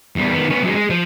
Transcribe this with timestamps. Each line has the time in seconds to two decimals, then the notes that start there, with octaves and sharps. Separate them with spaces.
0.16 E2 G3
0.34 D#3 B3
0.50 B3 C#4
0.63 F#2 G#3
0.75 G#3
0.90 F3